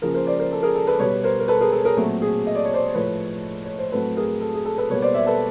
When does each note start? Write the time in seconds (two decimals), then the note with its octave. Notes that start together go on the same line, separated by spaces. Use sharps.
0.02 C#3 F3 A#3 G#4 A#4
0.14 A#4 C5
0.27 C5 D5
0.39 A#4 C5
0.52 A4
0.63 G#4 A#4
0.75 A4
0.87 A4 B4
0.99 B2 G3 B3 B4 C#5
1.24 A#4 C5
1.40 A#4
1.48 A4 B4
1.60 G#4 A#4
1.72 A4
1.85 G#4 A#4
1.97 A#2 F#3 A3 C4
2.22 G#4
2.47 D#5
2.55 D5
2.65 C#5
2.74 C5 D5
2.94 A2 F3 A3 B4 C#5
3.65 C#5
3.78 C5
3.92 A2 F#3 A3 C4 A4 B4
4.17 G#4 A#4
4.41 A4
4.54 G#4
4.65 A4
4.78 A4 B4
4.90 B2 G3 A#3 B4 C#5
5.02 C5 D5
5.14 D5 E5
5.27 A4 B4